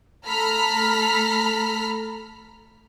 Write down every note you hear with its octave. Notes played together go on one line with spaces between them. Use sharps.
A3 A4 A#5 B5 F6 B6